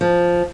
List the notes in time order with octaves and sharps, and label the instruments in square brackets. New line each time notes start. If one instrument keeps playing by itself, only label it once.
[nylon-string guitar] F3